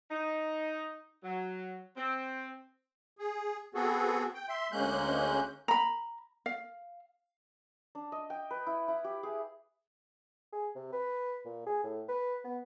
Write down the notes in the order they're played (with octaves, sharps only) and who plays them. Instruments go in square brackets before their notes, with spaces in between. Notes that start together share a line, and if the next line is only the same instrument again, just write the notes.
[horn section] D#4
F#3
C4
[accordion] G#4
B3 C4 F#4 G#4 A4
G5
E5 C6
D2 G#3 A#3 C#4 F#6 G6
[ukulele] A#5 B5
F5
[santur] D4
D#5
G5
B4
E4
E4
G4
G#4
[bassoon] G#4
C3
B4
A#2
G#4
A2
B4
B3